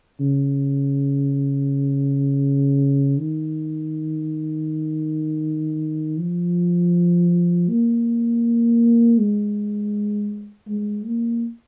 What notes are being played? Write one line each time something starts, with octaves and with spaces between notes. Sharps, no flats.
C#3
D#3
F3
A#3
G#3
G#3
A#3